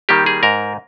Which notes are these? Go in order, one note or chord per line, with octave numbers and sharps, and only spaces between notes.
D#3 G3 A#3 G4
G#4
G#2 A#4